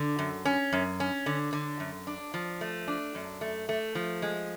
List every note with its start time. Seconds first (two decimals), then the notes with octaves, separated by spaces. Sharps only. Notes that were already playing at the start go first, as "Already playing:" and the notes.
Already playing: D3
0.19 F#2
0.45 C#4
0.73 F#2
1.00 C#4
1.26 D3
1.53 D3
1.80 F#2
2.07 D4
2.34 F3
2.61 A3
2.88 D4
3.15 F#2
3.41 A3
3.69 A3
3.95 F3
4.22 G#3